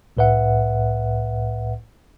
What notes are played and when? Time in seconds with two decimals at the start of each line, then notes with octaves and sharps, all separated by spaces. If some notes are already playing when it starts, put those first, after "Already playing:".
0.17 C2 A2 B4 E5 F#5